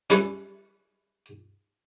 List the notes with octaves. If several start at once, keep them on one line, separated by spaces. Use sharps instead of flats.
G3 C#4 E4 A4 B4